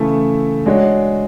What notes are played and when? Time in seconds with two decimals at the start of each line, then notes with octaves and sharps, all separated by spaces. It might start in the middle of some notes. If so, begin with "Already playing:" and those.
Already playing: C#3 E3 A3 E4 A4
0.66 G#3 D4 F#4 C#5